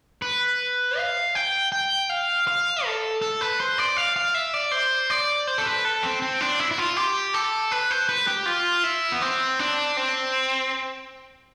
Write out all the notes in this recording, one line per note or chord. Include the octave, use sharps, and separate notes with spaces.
B4
F5
G5
G5
F5
F5
A4
A4
B4
C5
D5
F5
F5
E5
D5
C5
D5
C5
A4
B4
A4
C4
C4
D4
E4
E4
F4
G4
A4
B4
C5
B4
G4
F4
E4
B3
C4
D4
C4